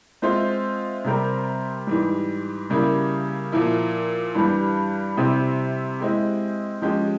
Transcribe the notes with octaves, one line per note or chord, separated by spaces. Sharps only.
G#3 C4 F4 C5 E5
C3 G3 C4 G4 A#4
G#2 E3 G3
C#3 G3 A#3 E4
A#2 F3 A#3 E4
G2 E3 G3
C3 G3 C4 E4 G4
G#3 C4 E4 G4
F3 G#3 C#4 G4